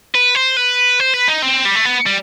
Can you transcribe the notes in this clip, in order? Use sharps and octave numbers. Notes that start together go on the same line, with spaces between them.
B4
C5
B4
C5
B4
D#4
C4
G3
A3
B3
G3